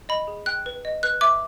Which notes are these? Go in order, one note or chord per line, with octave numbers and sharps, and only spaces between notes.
D#5 B5
G#4
G5 F#6
B4
D#5
B4 F#6
E5 D6